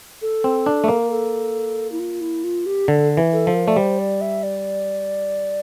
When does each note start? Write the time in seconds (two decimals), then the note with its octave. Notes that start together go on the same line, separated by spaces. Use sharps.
0.22 A4
0.44 C4
0.66 D4
0.84 A3
0.88 A#3
1.01 A#4
1.11 A4
1.92 E4
1.99 F4
2.21 E4
2.44 F4
2.66 G4
2.88 D3 A4
3.17 E3
3.33 A4
3.47 F3
3.54 A#4
3.67 A3 D5
3.77 G3 C5
3.99 D5
4.21 E5
4.43 D5